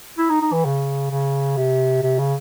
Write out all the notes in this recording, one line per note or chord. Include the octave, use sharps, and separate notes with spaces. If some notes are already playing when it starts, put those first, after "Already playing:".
E4
D#4
D#4
E3
C#3
C#3
C3
C3
C#3